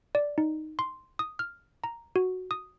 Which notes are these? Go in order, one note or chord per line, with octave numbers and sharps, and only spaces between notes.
D5
D#4
C6
D#6
F6
A#5
F#4
D#6